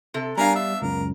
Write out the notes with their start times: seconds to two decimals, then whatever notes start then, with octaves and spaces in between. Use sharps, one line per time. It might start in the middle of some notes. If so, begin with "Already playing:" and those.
0.14 C3 A4
0.37 G3 B3 D4 A#4 F5 G#5 A#5
0.55 E5
0.82 C#2 F#2 A#4